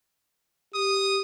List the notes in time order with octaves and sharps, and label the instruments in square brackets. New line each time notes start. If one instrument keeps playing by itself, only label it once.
[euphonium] G4 [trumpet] D#6